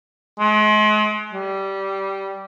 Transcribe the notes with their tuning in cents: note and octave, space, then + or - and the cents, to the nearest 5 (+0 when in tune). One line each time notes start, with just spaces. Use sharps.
G#3 +40
G3 -15